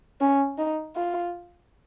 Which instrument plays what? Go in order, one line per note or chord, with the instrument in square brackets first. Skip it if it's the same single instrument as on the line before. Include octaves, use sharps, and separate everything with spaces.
[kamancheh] C#4
D#4
F4